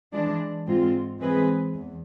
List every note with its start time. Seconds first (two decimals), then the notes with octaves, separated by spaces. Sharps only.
0.13 E3 G#3 D4
0.67 G#2 G#3 C4 F4
1.20 E3 G#3 C4 G#4 B4
1.74 E2